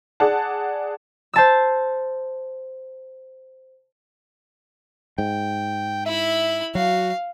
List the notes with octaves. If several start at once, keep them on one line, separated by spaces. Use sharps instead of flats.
G#4 D5 F#5 A5
C5 A5 E6
G#2 G5
E4 E5 B5
F#3 F#4 F5